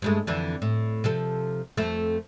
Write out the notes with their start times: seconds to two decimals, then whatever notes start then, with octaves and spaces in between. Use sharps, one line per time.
0.02 G2 G#3 A3
0.27 F2 D3 E3
0.62 A2
1.04 C3 F3 A4
1.77 F2 A3